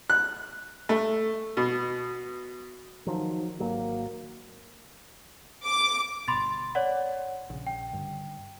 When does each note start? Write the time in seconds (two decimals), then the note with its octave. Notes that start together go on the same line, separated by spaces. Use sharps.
0.10 F#6
0.89 A3
1.57 B2
3.07 D#3 F3 F#3
3.60 G#1 F#3 A#3
5.65 D6
6.28 G1 B2 B5 C6 A6
6.75 C#5 D5 F#5
7.50 A#1 C#3
7.67 G5
7.93 G2 D3